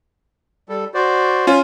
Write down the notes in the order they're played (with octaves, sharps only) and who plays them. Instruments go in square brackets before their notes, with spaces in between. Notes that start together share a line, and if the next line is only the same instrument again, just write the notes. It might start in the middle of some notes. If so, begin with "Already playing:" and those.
[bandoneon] G3 A4
F#4 C5 D5
[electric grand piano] C#4 F4